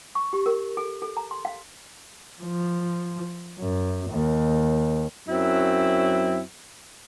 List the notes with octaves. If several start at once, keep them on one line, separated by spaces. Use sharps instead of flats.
C#6
G4
A#4
A4
A4
A#5
C6
F5
F3
F#2
D#2
F#2 F#3 C4 E4